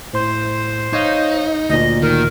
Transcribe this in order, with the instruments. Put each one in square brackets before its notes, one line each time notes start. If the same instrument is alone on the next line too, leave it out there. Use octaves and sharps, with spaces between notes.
[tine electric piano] A2 C6 [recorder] C5
[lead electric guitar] D#4 [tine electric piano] C#5 D#5 F5
[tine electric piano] D2 A#2 [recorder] D#5
[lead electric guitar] D#3 [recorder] A#4